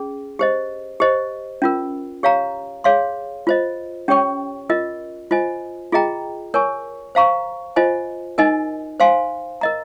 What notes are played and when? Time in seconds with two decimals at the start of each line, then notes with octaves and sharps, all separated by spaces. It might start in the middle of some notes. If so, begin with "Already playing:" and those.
Already playing: C#4 G#4
0.39 G4 C5 D#5
1.00 G4 C5 D#5
1.62 C#4 F4 A#4
2.23 G4 C#5 F5 A#5
2.84 G#4 C#5 F5 C6
3.47 F4 C5 D#5
4.08 C#4 G4 C#5 G5 C#6
4.70 F4 A#4 D#5
5.31 F4 C5 D#5 G#5
5.92 F4 G#4 D#5 G5 A#5
6.54 A#4 C#5 G#5 C#6
7.15 C5 F5 A#5 C#6
7.76 F4 C5 D#5 G#5
8.38 D#4 A#4 D#5 G#5
9.00 C5 F5 G#5 C6
9.61 A#4 D#5 A#5